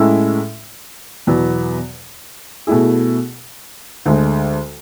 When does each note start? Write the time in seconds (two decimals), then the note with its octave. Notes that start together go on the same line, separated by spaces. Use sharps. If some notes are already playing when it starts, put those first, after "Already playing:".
Already playing: A2 G#3 C#4 E4 A4
1.27 E2 B2 F#3 B3
2.67 B2 A3 E4 G#4
4.06 D2 D3 G#3